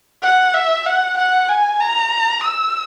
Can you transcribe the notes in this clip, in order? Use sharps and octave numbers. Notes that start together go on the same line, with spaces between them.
F#5
E5
F#5
F#5
G#5
A#5
E6